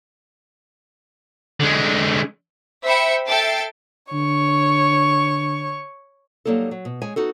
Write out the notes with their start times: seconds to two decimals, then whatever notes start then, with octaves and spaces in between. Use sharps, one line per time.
1.60 D3 G#3
2.84 C5 E5 G5 B5 C#7
3.27 A4 E5 G5 A6 C7 D7
4.12 D3 C#5 C#6
6.45 F#3 G3 A#3 D#4 A4
6.71 F#3
6.85 B2
7.02 G#3 C#5 G#5
7.16 B3 D#4 F#4 A4